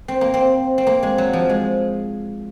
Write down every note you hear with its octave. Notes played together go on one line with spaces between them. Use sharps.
C4
A#3
C4
C4
A#3
G#3
F#3
F3
G#3